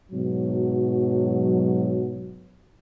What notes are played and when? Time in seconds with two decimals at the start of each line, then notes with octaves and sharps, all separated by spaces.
0.12 G#2 B2 F#3